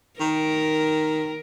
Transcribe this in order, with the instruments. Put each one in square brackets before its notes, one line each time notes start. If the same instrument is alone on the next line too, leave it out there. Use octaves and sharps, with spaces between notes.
[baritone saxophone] D#3 [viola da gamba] A#4